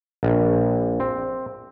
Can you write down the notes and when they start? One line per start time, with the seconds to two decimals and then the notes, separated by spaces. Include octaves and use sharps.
0.23 A#1
1.00 C4